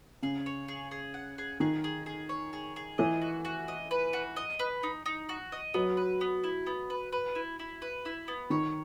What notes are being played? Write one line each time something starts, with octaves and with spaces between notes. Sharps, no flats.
C#3 G#4
C#5
G#4
G#4
F#5
G#4
D#3 G#4
G#4
G#4
C#5
G#4
G#4
E3 D#5
F#4
F#4
D#5
B4
F#4
D#5
B4
D#4
D#4
F#4
D#5
F#3 B3
B4
B3
E4
B3
B4
B4
E4
E4
B4
E4
B3
D#3 C#5